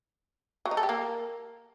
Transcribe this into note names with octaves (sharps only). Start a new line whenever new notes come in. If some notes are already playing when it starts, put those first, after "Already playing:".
F#3
D#4
A4
G4
A#3